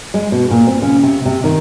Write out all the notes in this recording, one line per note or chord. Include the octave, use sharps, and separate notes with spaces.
G#3
B2
A#2
C4
C#3
C3
C3
D#3